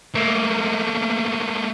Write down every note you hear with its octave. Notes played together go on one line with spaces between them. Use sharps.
A3 A#3